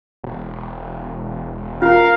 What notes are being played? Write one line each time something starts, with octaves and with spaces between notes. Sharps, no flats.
E1
C#4 F4 A#4 F5